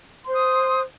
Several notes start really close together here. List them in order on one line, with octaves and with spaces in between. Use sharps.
C6 C5 F#6 D#6